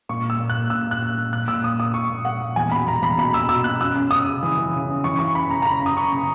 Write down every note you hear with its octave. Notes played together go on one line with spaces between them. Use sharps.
A#2 C#6
A#2
E6
A#2
F#6
A#2
A#2 E6
A#2 F#6
A#2
A#2
A#2 F#6
A#2 E6
A#2 D#6
A#2 D#6
A#2 C#6
A#2
A#2 F#5
A#2
E2 G#5
B2 B5
E2 A#5
E2 B5
B2 B5
B2 E6
B2 E6
B2 F#6
F#2 E6
F#2
F#2 D#6
C#3
E3
E3
C#3
F#2
E3 C#6
E3 C#6
F#2 B5
C#3 A#5
A#5
F#2 B5
F#2 D#6
F#2 C#6
C#3